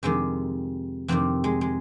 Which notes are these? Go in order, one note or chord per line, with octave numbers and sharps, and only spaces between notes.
F2 C3 D#3 G#3
F2 C3 D#3 C4
G#3
G#3